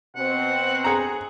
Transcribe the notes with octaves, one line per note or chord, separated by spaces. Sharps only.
B2 C4 F#5
G#4 A#5